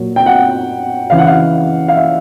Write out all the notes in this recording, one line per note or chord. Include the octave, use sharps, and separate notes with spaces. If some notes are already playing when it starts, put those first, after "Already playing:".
Already playing: A#2 F#3
G5
F#5
C#3 E3 F5
F#5
F5
F5
E5